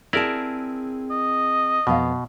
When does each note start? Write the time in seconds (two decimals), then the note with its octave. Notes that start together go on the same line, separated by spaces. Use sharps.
0.13 C4 E4 G#4 A#4 D5 A5
1.11 D#5
1.87 F2 B2 B3 F5